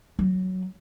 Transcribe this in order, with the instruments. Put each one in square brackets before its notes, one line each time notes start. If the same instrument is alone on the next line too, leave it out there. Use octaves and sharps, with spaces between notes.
[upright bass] F#3